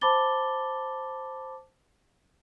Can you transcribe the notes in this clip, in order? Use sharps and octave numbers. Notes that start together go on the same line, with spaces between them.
C5 A5 B5 D6 A6 G7